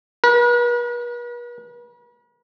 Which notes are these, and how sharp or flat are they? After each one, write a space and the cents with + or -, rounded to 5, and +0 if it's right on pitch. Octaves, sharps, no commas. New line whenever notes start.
B4 -45